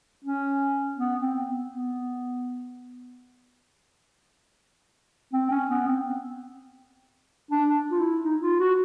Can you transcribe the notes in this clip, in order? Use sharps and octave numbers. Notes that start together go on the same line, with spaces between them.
C#4
B3
C4
B3
B3
C4
C#4
B3
C4
D4
F4
E4
D#4
F4
F#4